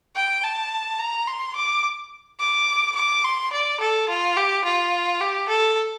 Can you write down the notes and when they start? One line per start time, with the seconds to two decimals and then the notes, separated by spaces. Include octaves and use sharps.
0.16 G5
0.44 A5
0.99 A#5
1.27 C6
1.55 D6
2.40 D6
2.95 D6
3.24 C6
3.52 D5
3.80 A4
4.09 F4
4.36 G4
4.64 F4
5.20 G4
5.48 A4